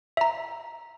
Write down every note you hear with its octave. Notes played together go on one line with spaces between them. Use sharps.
E5 A#5